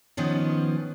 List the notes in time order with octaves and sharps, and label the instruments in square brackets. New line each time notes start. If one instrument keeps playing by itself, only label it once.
[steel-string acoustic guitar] D#3 F3 B3 C#4